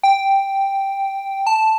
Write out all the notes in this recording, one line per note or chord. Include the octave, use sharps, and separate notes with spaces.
G5
A5